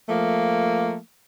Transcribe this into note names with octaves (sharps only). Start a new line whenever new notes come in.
F3 A3 A#3